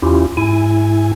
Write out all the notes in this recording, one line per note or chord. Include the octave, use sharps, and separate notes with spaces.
E2 C#4 E4 F4 G4
G#2 E4 G#5